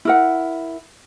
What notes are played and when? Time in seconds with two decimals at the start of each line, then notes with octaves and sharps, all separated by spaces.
0.05 E4 A#4 F#5